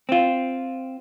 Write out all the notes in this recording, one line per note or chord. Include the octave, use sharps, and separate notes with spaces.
C4 F4